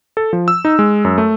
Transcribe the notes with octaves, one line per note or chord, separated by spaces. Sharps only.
A4
F3
E6
D#4
G#3
F#2
A3